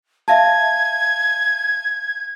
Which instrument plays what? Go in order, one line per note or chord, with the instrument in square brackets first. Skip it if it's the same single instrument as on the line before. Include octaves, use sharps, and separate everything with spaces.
[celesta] E5 F5 A5 [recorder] G#6